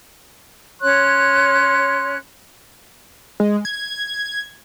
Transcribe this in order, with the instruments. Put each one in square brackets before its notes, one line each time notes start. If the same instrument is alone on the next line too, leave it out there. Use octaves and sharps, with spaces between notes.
[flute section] C#4 C#5 F#6 [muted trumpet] C6
[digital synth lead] G#3
G#6